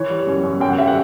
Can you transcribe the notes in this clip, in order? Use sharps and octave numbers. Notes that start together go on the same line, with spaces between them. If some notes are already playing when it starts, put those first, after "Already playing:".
Already playing: E3 C#5
G3
F#2
F#2
F#2 G5
F#5
G3 E5
F#5